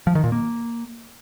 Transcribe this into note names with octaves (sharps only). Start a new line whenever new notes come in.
F3
D#3
A#2
A#3